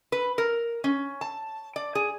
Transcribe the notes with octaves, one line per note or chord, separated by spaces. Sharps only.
B4
A#4
C#4
A5
D5
G#4